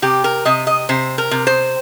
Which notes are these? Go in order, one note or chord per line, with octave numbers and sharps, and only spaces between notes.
C3 G4
A#4
C3 D#5
D#5
C3 C5
A#4
C3
C5